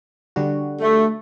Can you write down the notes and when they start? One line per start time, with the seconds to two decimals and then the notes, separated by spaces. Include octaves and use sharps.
0.36 D3 G3 F#4
0.80 A3